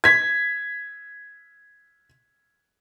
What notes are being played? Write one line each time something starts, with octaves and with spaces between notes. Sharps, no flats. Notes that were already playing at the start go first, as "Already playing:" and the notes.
G#6 B6